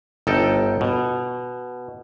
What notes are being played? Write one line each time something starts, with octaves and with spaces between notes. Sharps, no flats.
G1 D#4 A4 G5
B2